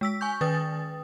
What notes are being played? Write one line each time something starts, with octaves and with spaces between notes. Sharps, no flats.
G#3 E6 B6
G#5 C#6 G6
D#3 B4 G5 D#6 A6